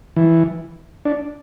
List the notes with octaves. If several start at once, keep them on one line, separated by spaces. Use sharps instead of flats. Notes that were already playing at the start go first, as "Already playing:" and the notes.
E3
D4